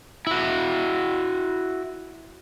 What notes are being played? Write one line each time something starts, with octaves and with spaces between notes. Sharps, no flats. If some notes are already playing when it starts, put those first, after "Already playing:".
E4 F#4